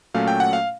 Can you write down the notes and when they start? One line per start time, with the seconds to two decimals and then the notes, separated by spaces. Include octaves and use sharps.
0.14 A#2 F#3 A3 C#4 F5
0.28 G5
0.40 F#5
0.53 F5